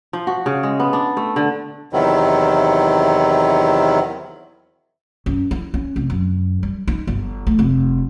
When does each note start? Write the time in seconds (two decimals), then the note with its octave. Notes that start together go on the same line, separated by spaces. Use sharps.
0.13 F3
0.27 F#4
0.46 C#3
0.63 G#3
0.80 B3
0.93 D4
1.17 A3
1.36 D3
1.93 E2 C3 D#3 F#3 E4
5.26 F#2
5.51 E4
5.74 C#4
5.96 F1
6.10 F#2
6.63 G3
6.88 D#4
7.07 G1
7.47 A3
7.59 F1